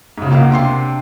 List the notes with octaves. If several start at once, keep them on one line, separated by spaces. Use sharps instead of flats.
G#2 C#3
C#2 A#3 F5 F#5
C3 D4 C6 C7